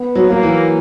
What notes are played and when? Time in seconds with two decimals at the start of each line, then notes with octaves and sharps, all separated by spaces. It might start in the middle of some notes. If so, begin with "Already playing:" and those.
Already playing: B3
0.15 F#3
0.30 F#3 A#3
0.43 E3